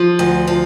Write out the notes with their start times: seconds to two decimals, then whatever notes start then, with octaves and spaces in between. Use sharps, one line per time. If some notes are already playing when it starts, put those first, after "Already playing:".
Already playing: F3
0.19 D2
0.47 F3